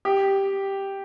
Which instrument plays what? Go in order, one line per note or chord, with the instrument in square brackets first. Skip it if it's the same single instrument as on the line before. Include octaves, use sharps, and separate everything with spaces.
[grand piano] G4